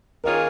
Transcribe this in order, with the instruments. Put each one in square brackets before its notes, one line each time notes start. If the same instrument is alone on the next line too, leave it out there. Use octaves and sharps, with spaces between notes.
[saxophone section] D#3 A#3 C#4 F4 G#4 [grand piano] A#4